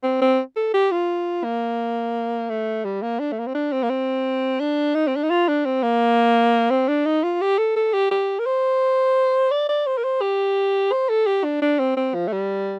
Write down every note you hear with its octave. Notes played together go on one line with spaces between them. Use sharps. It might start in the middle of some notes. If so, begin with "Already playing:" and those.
C4
C4
A4
G4
F4
A#3
A3
G3
A#3
D4
A3
A#3
C4
D4
C4
A#3
C4
D4
D#4
C4
D4
D#4
F4
D4
C4
A#3
C4
D4
D#4
F4
G4
A4
A4
G4
G4
A#4
C5
D5
D5
C5
A#4
C5
G4
C5
A4
G4
D4
D4
C4
C4
F3
A3
G3